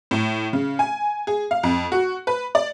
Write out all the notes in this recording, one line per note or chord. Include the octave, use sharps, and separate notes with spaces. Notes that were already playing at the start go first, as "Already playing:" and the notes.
A2
C#3
G#5
G#4
F5
F2
F#4
B4
D5